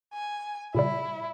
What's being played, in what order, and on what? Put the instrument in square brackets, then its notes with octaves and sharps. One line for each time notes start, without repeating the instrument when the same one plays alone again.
[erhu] G#5
[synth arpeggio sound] A#2 C#3 G3 [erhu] E4